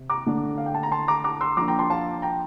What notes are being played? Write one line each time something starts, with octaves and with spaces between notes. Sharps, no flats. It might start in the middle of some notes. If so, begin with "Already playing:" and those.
Already playing: C3
A#5 D6
D3 A3 D4
F5
G5
A5
A#5
A5 C6
A#5 D6
A#5 D6
C6 E6
F3 A#3 D4 A#5 D6
G5 A#5
A5 C6
F5 A5
G5 A#5